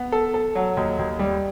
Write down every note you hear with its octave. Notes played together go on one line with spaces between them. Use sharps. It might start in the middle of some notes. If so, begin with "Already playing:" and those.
Already playing: B3
A4
A4
F#3
D#2
D#2
G3